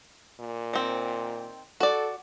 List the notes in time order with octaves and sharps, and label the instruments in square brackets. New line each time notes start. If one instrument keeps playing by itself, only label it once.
[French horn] A#2
[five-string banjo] D#3 C4
[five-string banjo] F#4 D5 [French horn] A4